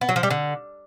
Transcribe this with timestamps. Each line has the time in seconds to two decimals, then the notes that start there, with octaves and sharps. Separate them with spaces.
0.01 B3
0.09 F#3
0.16 F3
0.23 G3
0.30 D3